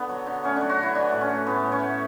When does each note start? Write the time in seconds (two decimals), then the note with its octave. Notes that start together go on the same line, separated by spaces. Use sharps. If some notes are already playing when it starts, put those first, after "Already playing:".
Already playing: D3 B3
0.09 F#3
0.27 D3
0.44 A3 C#4
0.56 F#3 D4
0.69 F#4
0.79 D3 E4
0.95 E3 D4
1.12 A2
1.21 C#4
1.29 A3
1.46 A2 B3
1.63 A2
1.72 C#4
1.80 A3